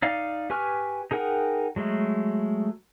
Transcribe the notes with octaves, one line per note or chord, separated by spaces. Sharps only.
D#4 D5 F5
G4 B4 G#5 C#6 F6
D#4 G#4 A#4 F#5 G5
F#3 G#3 A3